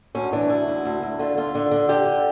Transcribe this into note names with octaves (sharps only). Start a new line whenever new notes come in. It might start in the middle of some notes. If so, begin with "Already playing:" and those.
D2 C#4
E3 D4
D2 E4
D2
D2
D2
D3 F4
D3 F4
D3
D3
D3 G4